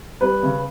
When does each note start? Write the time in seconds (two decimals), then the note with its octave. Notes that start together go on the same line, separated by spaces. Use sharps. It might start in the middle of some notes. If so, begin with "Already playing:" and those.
0.21 G3 B4
0.43 C#3